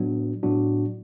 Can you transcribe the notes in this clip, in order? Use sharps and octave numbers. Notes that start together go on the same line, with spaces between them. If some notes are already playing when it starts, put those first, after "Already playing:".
Already playing: A2 F#3 B3 D4 F#4
A2 F#3 B3 D4 F#4